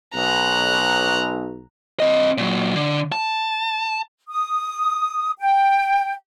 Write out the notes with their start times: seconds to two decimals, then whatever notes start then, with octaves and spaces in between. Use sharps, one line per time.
0.15 B1 A#5 F#6
2.00 C4 D#5
2.38 A#2 F#3
2.76 D3
3.12 A5
4.28 D#6
5.39 G5